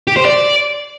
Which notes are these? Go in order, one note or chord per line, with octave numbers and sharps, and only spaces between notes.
G4
C5
D5